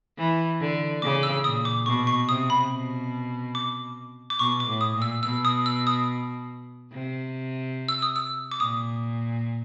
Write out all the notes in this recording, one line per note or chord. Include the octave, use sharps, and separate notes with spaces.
E3
D3
C#3 D6
E6
A#2 D#6
D6
B2 C#6
C#6
C3 D#6
B5
B2
D6
D6
B2 C#6
D6
A2
D#6
A#2
E6
B2 E6
D#6
E6
D#6
C3
E6
D#6
E6
D6
A#2 D#6